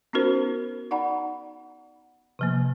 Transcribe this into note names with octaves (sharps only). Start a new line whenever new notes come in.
B3 C#4 D#4 F#4 A#4 C5
D#4 D5 F#5 A#5 B5
C3 F3 A#3